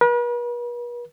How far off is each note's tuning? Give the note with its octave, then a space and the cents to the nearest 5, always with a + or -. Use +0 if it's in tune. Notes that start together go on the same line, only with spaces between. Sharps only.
B4 -45